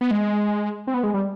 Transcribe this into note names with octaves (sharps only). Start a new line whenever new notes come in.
B3
G#3
C4
B3
G#3
G3